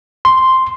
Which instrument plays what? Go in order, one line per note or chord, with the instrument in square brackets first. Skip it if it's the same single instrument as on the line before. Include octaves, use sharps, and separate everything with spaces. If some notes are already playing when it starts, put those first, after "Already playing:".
[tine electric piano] C6